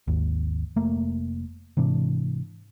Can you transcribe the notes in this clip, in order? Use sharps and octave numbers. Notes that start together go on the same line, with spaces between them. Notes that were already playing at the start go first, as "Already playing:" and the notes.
G#1 D#2
F1 A3 A#3
G#2 C3 E3 D4